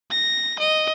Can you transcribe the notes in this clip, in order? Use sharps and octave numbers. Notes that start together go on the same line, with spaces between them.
A#6
D#5